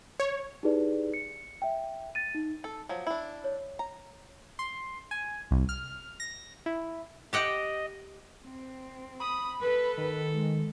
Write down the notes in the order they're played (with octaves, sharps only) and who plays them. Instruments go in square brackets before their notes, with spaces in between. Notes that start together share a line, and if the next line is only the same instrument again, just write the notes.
[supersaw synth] C#5
[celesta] D#4 E4 G4 G#4 B4 D5
C#7
E5 G5
A6 D#7
D#4
[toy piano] D#4 [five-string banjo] A4
[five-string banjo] F3 F#3
D4 E4
[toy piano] C#5
[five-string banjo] A#5
[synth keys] C6
G#5
C2
F6
A#6
E4
[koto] G4 F#5 G5 [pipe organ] D#5
[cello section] C4
[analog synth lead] B5 [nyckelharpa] D#6
[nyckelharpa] A4 [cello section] B4
[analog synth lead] D#3
[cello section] G#3